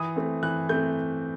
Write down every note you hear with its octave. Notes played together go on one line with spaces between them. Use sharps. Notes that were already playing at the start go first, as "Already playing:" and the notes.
Already playing: E3 D#6
A3 C4
E3 F#6
A3 C4 G6